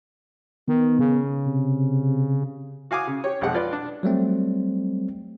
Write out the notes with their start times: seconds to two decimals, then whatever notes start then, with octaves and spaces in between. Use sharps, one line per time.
0.68 D#3 B3
0.99 C#3
1.47 C3
2.91 F#4 F5 G#5 D6 D#6
3.07 C#3
3.24 G4 C#5
3.41 B1 F2 G#3 G4 F#5
3.54 F4 B4 D5
3.73 D4
4.03 F#3 G3 A3 C4